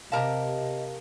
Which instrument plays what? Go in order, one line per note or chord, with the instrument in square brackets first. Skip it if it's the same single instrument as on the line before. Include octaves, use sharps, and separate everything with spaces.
[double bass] C3 [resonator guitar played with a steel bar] G4 A#4 A5 [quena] D#5 [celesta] F5